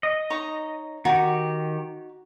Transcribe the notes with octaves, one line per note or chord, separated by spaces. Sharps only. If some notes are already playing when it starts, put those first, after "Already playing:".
D#5
D#4 C#5 A#5
D#3 D#4 F#4 G4